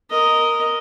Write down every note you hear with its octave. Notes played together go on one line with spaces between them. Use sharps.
A#4 D#5